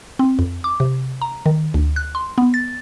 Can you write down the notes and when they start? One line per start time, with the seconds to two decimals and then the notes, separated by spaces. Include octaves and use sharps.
0.19 C4
0.39 F2
0.64 D6
0.80 C3
1.22 A#5
1.46 D#3
1.74 D2
1.96 F#6
2.15 C6
2.38 B3
2.54 A6